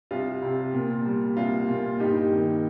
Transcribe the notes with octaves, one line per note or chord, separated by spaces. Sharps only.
C2 F4
C3
A#2
G3
C2 F4
A#2
G2 D#4 G4
D#3